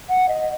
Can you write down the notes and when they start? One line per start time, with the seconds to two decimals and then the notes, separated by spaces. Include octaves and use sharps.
0.09 F#5
0.28 D#5